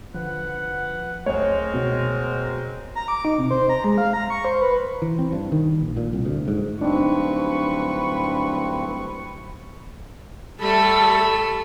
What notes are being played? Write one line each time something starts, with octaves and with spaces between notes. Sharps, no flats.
D3 F3 B4 F#5
C#2 F#2 G#3 A3 C4 A#4 C#5
B2
A#5
D6
D#4
C3
C5
A#5
G#3
F5
A#5
C#6
C5
B4
E3
C4
G2
D#3
A#1
A#2
C2
D2
G#2
D1 G2 C4 D4 D#4 B4 C#6
G3 A3 A4 B5